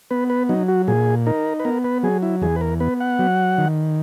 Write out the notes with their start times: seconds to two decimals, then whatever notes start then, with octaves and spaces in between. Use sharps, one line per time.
0.11 B3 B4
0.30 B4
0.49 F#3 D#4
0.68 F#4
0.88 A#2 G#4
1.26 D#4 A#4
1.60 B4
1.65 B3 A#4
1.84 B4
2.03 F#3 G#4
2.22 E4
2.42 E2 G#4
2.56 B4
2.61 A#4
2.80 B3 B4
3.00 F#5
3.19 F#3
3.58 D#3